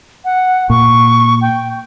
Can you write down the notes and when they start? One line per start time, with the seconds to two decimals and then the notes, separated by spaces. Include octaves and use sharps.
0.25 F#5
0.70 A#2 C#6
1.41 G5